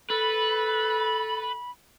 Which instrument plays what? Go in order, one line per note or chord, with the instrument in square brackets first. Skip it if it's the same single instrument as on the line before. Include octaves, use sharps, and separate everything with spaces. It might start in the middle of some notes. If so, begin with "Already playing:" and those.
[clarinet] A4 [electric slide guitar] B4 [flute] B5